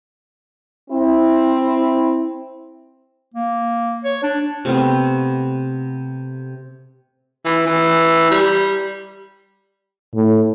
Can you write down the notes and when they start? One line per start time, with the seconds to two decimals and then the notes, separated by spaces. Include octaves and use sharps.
0.90 C4 E4
3.34 A#3
4.05 C#5
4.23 D4
4.65 C3 A3 B3 C4
7.45 E3
7.67 E3
8.31 G3
10.15 A2